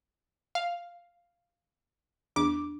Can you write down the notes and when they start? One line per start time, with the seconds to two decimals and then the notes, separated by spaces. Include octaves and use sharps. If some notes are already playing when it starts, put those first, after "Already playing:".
0.55 F5
2.36 E2 D4 D6